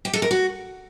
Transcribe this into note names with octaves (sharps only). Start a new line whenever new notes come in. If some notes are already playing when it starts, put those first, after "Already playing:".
G4
A4
A#4
F#4